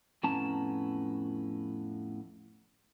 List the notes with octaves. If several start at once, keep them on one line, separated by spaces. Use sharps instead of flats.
F2 A2 B3 C#4 A5 A#5